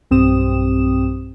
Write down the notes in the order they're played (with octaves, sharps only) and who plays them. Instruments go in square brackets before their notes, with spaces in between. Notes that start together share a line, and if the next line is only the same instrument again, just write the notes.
[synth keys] B1 G2 C4 G4 D#6 E7